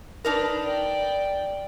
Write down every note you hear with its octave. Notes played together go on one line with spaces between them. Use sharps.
D4 D#4 A#4 B4
D5 G5